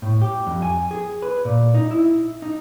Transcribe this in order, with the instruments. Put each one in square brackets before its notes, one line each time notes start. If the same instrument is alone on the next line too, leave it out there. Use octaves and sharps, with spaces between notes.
[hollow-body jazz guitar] A2
G4
F2
G#5
G#4
B4
A#2
D#4
E4
D#4